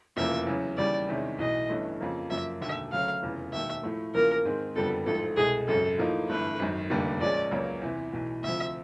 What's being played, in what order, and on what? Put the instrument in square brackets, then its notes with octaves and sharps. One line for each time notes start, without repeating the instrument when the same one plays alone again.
[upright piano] F1 E2 C#3 F3 A#3 [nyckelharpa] E5
[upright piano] E2 C#3 F#3
[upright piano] D#2 C#3 E3 G3 [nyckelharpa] D5
[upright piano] E2 C3 D#3 G#3 C#4
[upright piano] B1 A2 E3 [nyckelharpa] D#5
[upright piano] G1 G2 E3 A3 C#4
F2 C#3 F3 A#3
[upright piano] F#2 C#3 F3 A#3 [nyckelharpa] E5
[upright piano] E1 D#2 D3 [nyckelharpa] E5
[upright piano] D2 C#3 F#3 A3 [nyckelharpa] F5
[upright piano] F1 E2 C#3
[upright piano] E1 D#2 D#3 [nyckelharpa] E5
[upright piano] A2 F3 A3
[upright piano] E2 C#3 F3 A#3 [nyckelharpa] A#4
[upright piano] G#2 D#3 G#3 C4
[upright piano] F#1 F2 D3 G3 B3 [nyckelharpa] A4
[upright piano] A1 G#2 F3 [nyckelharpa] A4
[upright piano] C2 B2 G#3 [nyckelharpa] G#4
[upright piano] G#1 F#2 C#3 [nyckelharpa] A4
[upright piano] A2 F3 A#3 D#4
[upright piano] G1 G2 E3 A3 [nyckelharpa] B4
[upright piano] G#1 F#2 D#3
F1 D#2 D3 G3 A#3
[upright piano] A#1 A#2 F3 G#3 C#4 [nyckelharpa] D5
[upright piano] C#2 C#3 F#3 A#3 C#4
E2 C3 E3
B1 A2 E3
[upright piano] D2 C3 F3 [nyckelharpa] E5